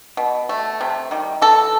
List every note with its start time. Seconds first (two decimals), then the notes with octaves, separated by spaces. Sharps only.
0.17 B2
0.49 A3
0.81 C3
1.11 D#3 G3
1.42 E3 A4